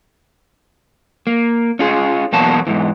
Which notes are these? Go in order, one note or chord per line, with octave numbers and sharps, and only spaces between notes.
A#3
C#4 F4 G#4
E2 B2 F#3 A#3 F#4 A5
E2 G#2 E3